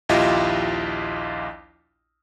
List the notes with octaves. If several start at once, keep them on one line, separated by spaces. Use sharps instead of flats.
A#1 D#2 E4 F4 G4 D#5